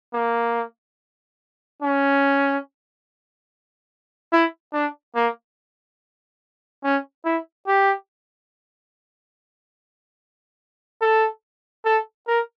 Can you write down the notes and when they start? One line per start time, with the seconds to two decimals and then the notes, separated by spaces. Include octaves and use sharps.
0.14 A#3
1.82 C#4
4.33 E4
4.74 D4
5.16 A#3
6.84 C#4
7.25 E4
7.67 G4
11.01 A4
11.85 A4
12.27 A#4